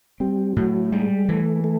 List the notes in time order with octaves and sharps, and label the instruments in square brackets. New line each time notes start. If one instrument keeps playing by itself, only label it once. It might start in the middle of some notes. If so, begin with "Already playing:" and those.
[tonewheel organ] G3 [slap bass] C4
[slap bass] A2 [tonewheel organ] F#3
[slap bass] G3 [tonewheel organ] G#3
[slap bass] E3 [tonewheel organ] A3
[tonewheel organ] A3